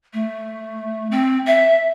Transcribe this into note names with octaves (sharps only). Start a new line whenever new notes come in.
A3
C4
E5